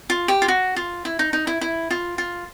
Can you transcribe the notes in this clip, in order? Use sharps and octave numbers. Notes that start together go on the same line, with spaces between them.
F4
G4
F4
F#4
F4
E4
D#4
D#4
E4
E4
F4
F4